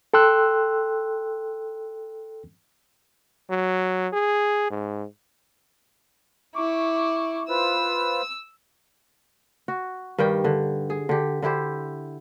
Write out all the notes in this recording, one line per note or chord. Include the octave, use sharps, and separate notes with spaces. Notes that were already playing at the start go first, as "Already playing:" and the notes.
A4 G5 C6 E6 F#6
F#3
G#4
G#2
E4 C#6 D6
F4 B4 C5 E6
F#4
G2 D#3 G3 G5
D3
G#4
D3 G4
D3 E4 G4 C5